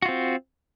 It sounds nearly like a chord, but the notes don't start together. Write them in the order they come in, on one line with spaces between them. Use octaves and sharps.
F#4 F4 C4